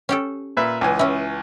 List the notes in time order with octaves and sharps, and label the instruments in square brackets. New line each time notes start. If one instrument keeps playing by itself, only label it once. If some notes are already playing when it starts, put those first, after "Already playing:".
[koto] C#4 G4 A4
[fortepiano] A#2 B4 E5
C#2 E3 G#5
[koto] C#4 E4